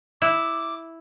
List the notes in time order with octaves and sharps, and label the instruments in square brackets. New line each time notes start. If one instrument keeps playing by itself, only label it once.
[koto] E4 [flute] D6